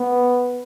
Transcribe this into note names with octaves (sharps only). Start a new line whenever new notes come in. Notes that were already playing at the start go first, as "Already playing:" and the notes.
Already playing: B3